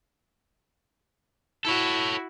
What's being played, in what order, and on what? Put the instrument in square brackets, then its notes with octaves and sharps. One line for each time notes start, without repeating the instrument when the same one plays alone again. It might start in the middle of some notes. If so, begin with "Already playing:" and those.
[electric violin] E4 F#4 [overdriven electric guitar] A4 C#5